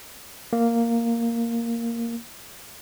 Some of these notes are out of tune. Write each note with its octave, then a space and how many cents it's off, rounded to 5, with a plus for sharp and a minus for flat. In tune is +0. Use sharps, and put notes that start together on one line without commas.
A#3 -5